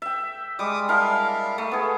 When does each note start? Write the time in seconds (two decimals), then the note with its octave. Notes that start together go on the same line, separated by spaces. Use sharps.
0.02 E5 G5
0.59 G3 G#3 D6 D#6
0.89 D4 E4 A#4 F5
1.58 A3
1.71 B3 G#4